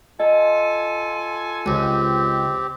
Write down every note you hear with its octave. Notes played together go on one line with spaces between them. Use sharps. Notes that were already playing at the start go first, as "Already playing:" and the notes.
F4 A4 D#5 G#5 A5
C#2 C4 G4